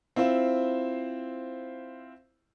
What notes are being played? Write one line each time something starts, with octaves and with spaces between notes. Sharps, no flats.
C4 E4 F4 C5